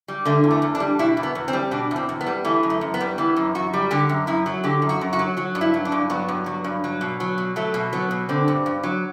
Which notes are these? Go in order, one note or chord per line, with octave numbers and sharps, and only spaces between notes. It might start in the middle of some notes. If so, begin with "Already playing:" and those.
G3
D3 A3
E2
A3
E2
D4
G3
B2 E4
E2
B3
E2
C4
G3
B2 D4
E2 C4
E2
B3
G3
E3 A3
F#2
A3
F#2
B3
G3
E3 B3
F#2
F#2 F#4
G3
D3 G4
F#2
F#2 E4
F#3
D3 G4
F#2
F#4
F#2
F#4
F#3
F#3 F#4
G2
E4
F#3
D4
G2
F#3 B3
G2
F#3
G2
F#3
B2
F#3
B2
F#3 A3
B2
F#3 B3
B2
D3 C4
G2
G2
F#3